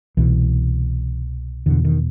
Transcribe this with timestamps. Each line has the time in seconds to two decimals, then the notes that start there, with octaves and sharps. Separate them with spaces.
0.17 C2 B2 E3
1.66 E2 B2 D3
1.85 D#3